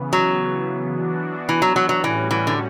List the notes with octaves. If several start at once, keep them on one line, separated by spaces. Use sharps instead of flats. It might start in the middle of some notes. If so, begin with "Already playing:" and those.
Already playing: C#3 E3 B3
F#3
E3 B3 D4 F#4
E3
F#3
F#3
F#3
A2 E3 G3 C#4 F#4
E3
D3